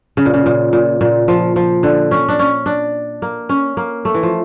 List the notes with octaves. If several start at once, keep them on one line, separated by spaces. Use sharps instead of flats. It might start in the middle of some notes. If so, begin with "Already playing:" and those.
C#3
A#2
C#3
A#2
A#2
A#2
F3
F3
D3
C#4
D4
C#4
D4
A#3
C#4
A#3
A3
E3
F3